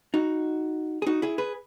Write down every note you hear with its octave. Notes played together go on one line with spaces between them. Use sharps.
D#4 F#4
G#4
D#4 F#4
E4 G#4
G#4 B4